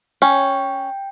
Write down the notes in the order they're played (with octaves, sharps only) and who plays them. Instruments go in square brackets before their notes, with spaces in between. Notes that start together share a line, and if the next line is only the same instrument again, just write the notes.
[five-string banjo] C#4 [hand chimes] G5